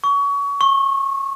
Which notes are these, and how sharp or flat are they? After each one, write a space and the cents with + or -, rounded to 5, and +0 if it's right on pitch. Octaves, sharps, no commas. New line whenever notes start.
C#6 +30
C#6 -25